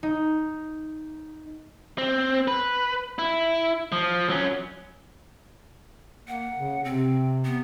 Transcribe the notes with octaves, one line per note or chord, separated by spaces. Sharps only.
D#4
C4
B4
E4
F3
F#3 C#4
A#3 F#5
C#3
C3 C4
B3